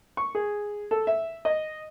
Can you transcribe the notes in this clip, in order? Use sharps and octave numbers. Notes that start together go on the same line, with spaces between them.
C#6
G#4
A4
E5
D#5